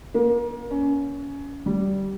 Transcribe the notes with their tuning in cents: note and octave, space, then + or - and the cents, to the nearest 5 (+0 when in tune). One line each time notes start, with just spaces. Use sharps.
A#3 +30
C#4 +20
G3 -15